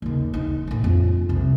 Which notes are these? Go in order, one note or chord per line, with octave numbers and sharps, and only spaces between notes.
D#2 C#3
D#4
D2 A2
F2 F4
C2 C3